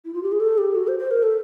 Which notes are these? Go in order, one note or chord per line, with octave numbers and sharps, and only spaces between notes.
E4
F4
G4
G#4
A4
G4
F#4
C5
C5
A#4
A4